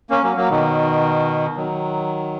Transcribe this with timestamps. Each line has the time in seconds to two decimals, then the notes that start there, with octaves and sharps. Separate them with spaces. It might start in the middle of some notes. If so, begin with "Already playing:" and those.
0.10 A#3 C#4
0.23 F#3 A#3
0.37 F#3 A#3
0.50 B2 D#3
1.57 D#3 F#3